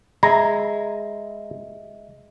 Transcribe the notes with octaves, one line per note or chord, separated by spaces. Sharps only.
G#3 D#5 E5 A#5